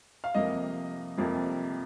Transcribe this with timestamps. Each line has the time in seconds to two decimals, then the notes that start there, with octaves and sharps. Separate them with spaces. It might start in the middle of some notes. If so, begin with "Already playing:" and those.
0.24 F5
0.34 F2 C3 F3 A#3 D#5
1.17 F2 C3 F3 A#3